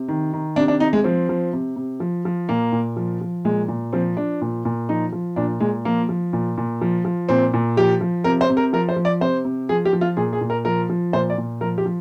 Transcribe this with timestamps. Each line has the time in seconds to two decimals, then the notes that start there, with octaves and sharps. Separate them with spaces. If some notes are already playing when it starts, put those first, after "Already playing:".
Already playing: C3
0.08 D#3
0.33 D#3
0.56 C3 D4
0.68 D4
0.80 C3 D#4
0.93 G#3
1.04 F3 C4
1.29 F3
1.53 C3
1.76 C3
2.00 F3
2.25 F3
2.49 A#2 A#3
2.72 A#2
2.97 F3
3.21 F3
3.45 A#2 G#3
3.68 A#2
3.93 F3 C4
4.17 F3 D4
4.41 A#2
4.65 A#2
4.89 F3 D#4
5.12 F3
5.36 A#2 D4
5.60 A#2 G#3
5.85 F3 A#3
6.09 F3
6.33 A#2
6.58 A#2
6.81 F3
7.05 F3
7.29 A#2 C4
7.54 A#2
7.77 F3 G4
8.01 F3
8.24 C3 A#4
8.41 C5
8.50 C3
8.57 A#4
8.73 F3 A#4
8.89 C5
8.96 F3
9.05 D5
9.21 C3 C5
9.45 C3
9.69 F3 G#4
9.85 G4
9.93 F3
10.01 F4
10.17 A#2 G#4
10.33 G#4
10.41 A#2
10.50 A#4
10.65 F3 A#4
10.90 F3
11.13 A#2 C5
11.30 D5
11.38 A#2
11.61 F3 A#4
11.78 G4
11.86 F3